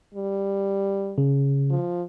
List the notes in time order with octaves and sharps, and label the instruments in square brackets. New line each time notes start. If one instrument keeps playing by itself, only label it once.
[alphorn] G3
[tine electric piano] C#3
[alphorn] F3